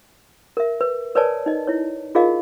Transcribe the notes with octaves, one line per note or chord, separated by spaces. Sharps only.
A#4 E5
B4
A#4 B4 C#5 D5 G#5 A5
D#4 D#5
E4 C#5
D#4 F4 G#4 A#4 D#5 F5